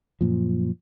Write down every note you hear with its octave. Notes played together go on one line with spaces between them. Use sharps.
F#2 A#2 F3